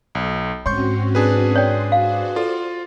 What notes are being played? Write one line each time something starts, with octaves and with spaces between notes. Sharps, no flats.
B1
G#2 C4 C#4 F#4 C#5 C6 C#6 G6
D4 G#4 B4
C#5 D5 G5 C6 D#6
F#4 C5 D5 F5
F4 A4